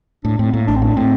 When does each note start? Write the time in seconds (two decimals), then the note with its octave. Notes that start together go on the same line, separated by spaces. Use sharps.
0.24 A2 D4
0.39 A2 C4
0.53 A2 A#3
0.68 A1 D4
0.76 C4
0.82 A2 D4
0.96 A2 C4